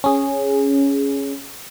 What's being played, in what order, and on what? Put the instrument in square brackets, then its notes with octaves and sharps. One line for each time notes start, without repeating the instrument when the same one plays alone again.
[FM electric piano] C#4 G#4